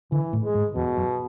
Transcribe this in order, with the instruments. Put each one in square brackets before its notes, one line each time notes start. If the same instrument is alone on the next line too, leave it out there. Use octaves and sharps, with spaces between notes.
[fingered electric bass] D3 [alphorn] E3
[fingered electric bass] A2
[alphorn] G#3
[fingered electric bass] G#2
[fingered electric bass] E2 [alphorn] B2
[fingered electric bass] F#2